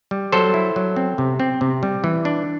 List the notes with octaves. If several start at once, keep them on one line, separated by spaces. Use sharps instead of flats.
G3
F#3 A4 C5
E4
F#3
C4
C3
C4
C3
G3
E3
D4